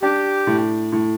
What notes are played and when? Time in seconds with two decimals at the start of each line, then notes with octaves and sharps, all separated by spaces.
0.02 D4 G4
0.47 A2
0.92 A2